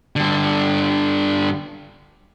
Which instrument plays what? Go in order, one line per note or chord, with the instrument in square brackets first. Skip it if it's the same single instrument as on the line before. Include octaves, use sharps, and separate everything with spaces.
[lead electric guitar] G2 D3